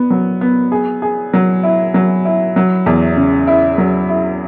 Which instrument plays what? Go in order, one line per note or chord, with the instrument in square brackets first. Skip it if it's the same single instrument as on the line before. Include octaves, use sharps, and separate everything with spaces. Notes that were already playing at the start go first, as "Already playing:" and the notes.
Already playing: [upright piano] B3
F#3
B3
G#4
G#4
F#3
E4
F#3
E4
F#3
E2
C#3
E4
F#3
E4